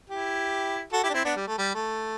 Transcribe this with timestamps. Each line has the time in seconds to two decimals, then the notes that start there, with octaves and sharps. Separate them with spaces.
0.10 E4 G4
0.92 F#4 A4
1.03 E4 G4
1.09 D4
1.14 C4 E4
1.24 B3 D4
1.36 G3
1.47 A3
1.58 G3
1.75 A3